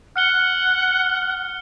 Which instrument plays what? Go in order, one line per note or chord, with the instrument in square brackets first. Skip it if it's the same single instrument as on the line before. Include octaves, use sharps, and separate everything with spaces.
[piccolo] F#5 [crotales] F6 C#7 G7